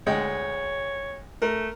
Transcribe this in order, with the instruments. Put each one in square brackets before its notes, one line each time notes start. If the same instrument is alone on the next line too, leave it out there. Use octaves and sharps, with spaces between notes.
[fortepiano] D2 G#3 G5 [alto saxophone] C#5
[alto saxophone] A3 [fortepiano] A#4